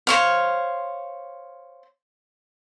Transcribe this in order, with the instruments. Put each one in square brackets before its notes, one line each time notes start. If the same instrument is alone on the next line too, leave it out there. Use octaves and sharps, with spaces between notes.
[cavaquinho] C5 C#5 F5